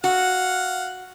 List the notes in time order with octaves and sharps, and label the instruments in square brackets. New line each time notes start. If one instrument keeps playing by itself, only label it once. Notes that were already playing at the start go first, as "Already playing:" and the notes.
[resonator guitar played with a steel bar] F#4 [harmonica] F5 F#5